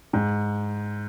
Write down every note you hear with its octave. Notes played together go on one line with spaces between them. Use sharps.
G#2